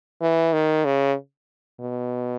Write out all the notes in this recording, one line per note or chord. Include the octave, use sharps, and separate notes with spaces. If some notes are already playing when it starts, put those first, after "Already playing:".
E3
D#3
C#3
B2